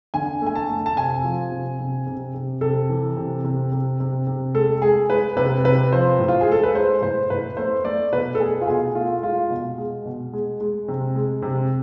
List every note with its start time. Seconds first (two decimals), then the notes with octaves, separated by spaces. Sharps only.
0.14 D3 G#5
0.42 A3 G#5
0.55 A5
0.69 A3
0.86 A5
0.96 C3 G#5
1.24 F3
1.52 C3
1.79 C3
2.07 C3
2.34 C3
2.61 C3 A4
2.90 E3
3.17 C3
3.44 C3
3.72 C3
4.00 C3
4.27 C3
4.54 G#3 A4
4.81 G#3 G#4
5.10 G#3 B4
5.37 C3 B4
5.64 C3 B4
5.92 F3 C5
6.19 A2
6.28 F4
6.41 G#4
6.48 G#3 A4
6.63 B4
6.75 G#3 C5
7.02 A2 C5
7.30 A2 B4
7.57 A3 C5
7.85 A3 D5
8.12 B2 B4
8.35 A4
8.40 A3 G#4
8.61 F4
8.67 B2 G#4
8.95 A3 F4
9.22 G#3 F4
9.50 B2
9.78 G#3
10.05 B2
10.33 G#3
10.60 G#3
10.88 C3
11.15 G#3
11.42 C3